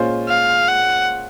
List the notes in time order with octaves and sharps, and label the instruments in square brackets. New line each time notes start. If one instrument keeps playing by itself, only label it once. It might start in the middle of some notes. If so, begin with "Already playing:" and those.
Already playing: [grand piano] A#2 G#3 C#4 F4 C5
[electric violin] F5
F#5